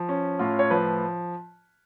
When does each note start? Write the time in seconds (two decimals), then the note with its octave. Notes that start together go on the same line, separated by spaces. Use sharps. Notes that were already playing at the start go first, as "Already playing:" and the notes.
Already playing: F3
0.09 C#4
0.39 A2 F4
0.59 C#5
0.70 F3 B4